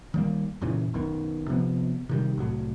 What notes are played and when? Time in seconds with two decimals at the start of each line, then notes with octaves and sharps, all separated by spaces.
0.14 D#3 G3 A#3
0.61 F#2 A#2 C#3 E3
0.94 B1 F#2 B2 D#3
1.48 C3 F3 B3
2.09 C3 D#3 G3
2.37 C2 A2 F#3